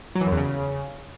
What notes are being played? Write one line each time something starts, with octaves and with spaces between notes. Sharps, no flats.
F#3
E3
F#2
E2
C#3